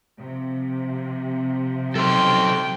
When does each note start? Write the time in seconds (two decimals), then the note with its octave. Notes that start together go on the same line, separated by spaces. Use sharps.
0.19 C3 F3
1.95 F#3 D#4 A4 C5 G5